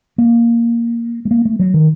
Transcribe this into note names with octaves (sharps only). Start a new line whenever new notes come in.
A#3
A3
A#3
A3
F#3
D#3